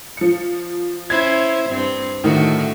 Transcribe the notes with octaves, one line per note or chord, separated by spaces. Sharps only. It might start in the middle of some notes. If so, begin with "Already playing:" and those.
F3 C#7
C#4 E4 C5 G#6
G2 C4
A2 D3 D#3 A3 F#4